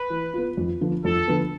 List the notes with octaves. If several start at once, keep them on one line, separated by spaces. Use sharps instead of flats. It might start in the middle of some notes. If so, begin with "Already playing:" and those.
Already playing: B4
E3
B3 F4
F2
D3 F3 B3
F2 A4
D3 F3 B3